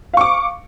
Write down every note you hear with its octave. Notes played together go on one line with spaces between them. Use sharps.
F5 C#6 D6